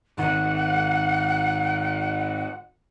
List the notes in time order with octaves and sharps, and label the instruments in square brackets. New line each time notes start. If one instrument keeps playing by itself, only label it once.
[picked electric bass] G#1 D#3 [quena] F#5